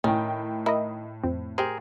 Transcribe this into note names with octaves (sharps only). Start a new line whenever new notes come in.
A2 D#3 C#4 G5
E4 A#4 D#5
F2 C4
G4 G#4 A#4 C5